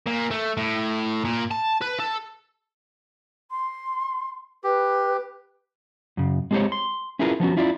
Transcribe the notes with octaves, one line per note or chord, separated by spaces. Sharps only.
A#2
A3
A2
A#2
A5
B4
A4
C6
G4 B4
F#2 C#3
G#3 C4 G4 A4 C5 C#5
C6
C#4 E4 F4 G#4 A#4 B4
F3 B3 C#4 F#4
C#4 E4 F4 D5